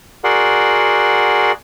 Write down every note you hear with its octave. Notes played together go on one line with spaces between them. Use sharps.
F#4 G#4 A#4 D5 F#5 C6